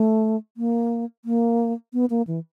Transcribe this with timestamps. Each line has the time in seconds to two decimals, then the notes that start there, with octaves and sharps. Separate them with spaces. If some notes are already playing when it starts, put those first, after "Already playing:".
Already playing: A3
0.57 A#3
1.25 A#3
1.93 B3
2.10 A#3
2.27 E3